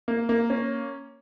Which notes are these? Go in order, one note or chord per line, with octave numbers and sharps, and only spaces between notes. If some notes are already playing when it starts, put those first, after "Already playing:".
A#3
A#3
C#4